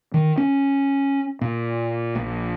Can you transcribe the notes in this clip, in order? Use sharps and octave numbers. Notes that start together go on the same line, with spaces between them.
D#3
C#4
A#2
A#1